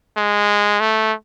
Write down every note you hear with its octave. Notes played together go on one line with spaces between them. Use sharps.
G#3
A3